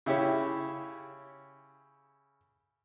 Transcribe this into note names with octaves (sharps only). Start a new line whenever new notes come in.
C#3 E4 G4 C#5